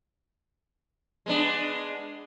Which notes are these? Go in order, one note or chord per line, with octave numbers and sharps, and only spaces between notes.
G#3 B3 D4